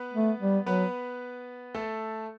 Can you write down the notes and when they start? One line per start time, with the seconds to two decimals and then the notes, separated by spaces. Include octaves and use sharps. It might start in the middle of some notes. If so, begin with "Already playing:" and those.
Already playing: B3 B4
0.13 A3
0.40 G3
0.66 F#3 B3 B4
1.74 A3 A4